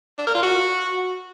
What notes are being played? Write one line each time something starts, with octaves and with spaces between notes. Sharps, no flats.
D4
A#4
F4
F#4